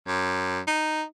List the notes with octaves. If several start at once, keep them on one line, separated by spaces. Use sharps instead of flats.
F#2
D#4